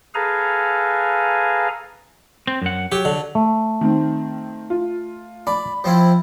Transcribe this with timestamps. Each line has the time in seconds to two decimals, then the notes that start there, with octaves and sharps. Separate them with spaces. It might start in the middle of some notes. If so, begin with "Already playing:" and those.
0.15 G#4 A4 B4 F5 G#5 A#5
2.47 C4
2.62 F#2 F#5
2.92 F#3 G4
3.05 D3
3.35 A3
3.81 D#3 C4
4.70 F4
5.47 D5 B5
5.84 F3 C4 E4